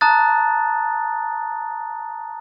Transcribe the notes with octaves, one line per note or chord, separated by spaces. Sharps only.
A5 A#5 D#6 F#6 A6